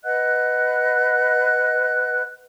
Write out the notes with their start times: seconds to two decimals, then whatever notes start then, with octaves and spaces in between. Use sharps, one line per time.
0.05 B4 D#5 F#5 F#6